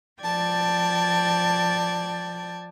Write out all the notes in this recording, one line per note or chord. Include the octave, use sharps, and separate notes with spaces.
F3 D5 G5 A5 G#6